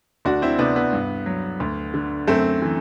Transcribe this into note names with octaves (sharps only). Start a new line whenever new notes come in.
D2 D4 F#4
C4 E4
C3 B3 D4
B3
G2
F#3
D2
D3
F#2 A3 C4
E3